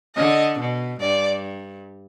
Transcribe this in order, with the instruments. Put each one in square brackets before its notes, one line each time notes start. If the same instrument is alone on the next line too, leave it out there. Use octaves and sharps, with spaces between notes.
[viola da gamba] D3 [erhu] D#5
[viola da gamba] B2
[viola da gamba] G2 [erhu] D5